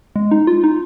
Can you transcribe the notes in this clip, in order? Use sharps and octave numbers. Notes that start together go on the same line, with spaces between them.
G#3
D#4
F4
D#4